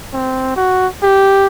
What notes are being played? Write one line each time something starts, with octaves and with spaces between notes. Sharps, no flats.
C4
F#4
G4